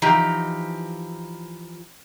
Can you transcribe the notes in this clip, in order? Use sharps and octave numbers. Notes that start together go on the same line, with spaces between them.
E3 F3 D#4 G4 A#5